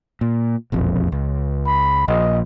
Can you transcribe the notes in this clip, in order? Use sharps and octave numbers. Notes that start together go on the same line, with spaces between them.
A#2
E1 A#1 F2
C#2
B5
A#1 D#5